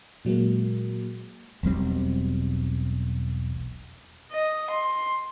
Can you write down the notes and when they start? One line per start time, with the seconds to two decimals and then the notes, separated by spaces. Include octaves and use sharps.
0.25 A#2 F#3 G#3 A#3
1.63 E1 B1 G3 C4
4.31 D#5
4.70 C6